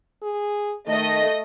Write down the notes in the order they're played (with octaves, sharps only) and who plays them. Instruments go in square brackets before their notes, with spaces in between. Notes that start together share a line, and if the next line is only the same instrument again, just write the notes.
[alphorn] G#4
[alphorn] D#3 [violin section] A3 D#5